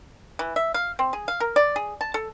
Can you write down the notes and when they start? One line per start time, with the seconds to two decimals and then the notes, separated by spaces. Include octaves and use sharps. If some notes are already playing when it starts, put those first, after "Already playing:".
0.39 E3
0.56 E5
0.74 F5
0.99 C4
1.13 G#4
1.28 F5
1.40 A#4
1.56 D5
1.76 G#4
2.01 A5
2.14 A4